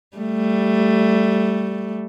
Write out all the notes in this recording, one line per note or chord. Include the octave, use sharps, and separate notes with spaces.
G3 A3